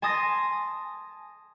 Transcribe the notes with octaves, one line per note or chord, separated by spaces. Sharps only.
G#5 A5 C6 D#6 A6 A#6